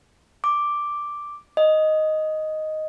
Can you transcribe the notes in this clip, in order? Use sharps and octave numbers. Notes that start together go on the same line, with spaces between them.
D6
D#5